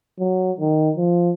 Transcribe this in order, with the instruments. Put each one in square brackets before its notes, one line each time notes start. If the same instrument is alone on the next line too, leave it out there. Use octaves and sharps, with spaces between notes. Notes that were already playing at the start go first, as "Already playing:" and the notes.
[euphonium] F#3
D#3
F3